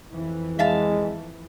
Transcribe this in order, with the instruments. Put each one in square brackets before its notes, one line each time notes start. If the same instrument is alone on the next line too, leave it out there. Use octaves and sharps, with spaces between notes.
[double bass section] F2 E3
[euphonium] G#3 [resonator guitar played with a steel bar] E5 F5 A5